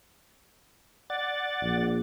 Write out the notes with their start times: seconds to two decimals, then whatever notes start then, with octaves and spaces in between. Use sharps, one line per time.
1.10 D5 F#5 A6
1.62 A#1